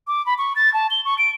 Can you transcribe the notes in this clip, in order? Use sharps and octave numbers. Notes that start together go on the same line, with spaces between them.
D6
B5
C#6
A6
A5
G7
C#6
D7